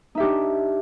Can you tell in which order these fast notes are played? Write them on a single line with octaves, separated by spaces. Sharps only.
D#4 E5 G4 D4